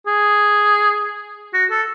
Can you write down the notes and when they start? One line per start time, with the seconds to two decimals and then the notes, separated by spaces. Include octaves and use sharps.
0.07 G#4
1.54 F#4
1.70 A4